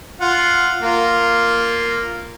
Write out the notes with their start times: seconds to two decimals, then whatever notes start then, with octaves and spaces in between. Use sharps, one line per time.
0.21 F4 F#5
0.82 A#3 F4